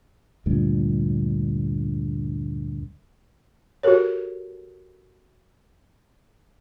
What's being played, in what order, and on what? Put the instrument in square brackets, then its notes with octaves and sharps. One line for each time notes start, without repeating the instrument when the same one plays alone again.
[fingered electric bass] D2 G2 A#2
[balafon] F#4 G4 A4 A#4 C#5